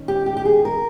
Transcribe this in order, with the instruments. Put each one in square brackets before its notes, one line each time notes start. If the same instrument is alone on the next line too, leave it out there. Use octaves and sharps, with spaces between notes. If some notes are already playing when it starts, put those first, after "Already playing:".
Already playing: [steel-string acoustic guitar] D#3 C#4
G4
G4
G4
G#4
A#4